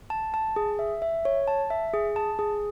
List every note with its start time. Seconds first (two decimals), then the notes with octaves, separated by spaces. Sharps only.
0.10 A5
0.34 A5
0.56 G#4
0.79 E5
1.02 E5
1.25 C#5
1.47 A5
1.70 E5
1.94 G#4
2.16 A5
2.39 G#4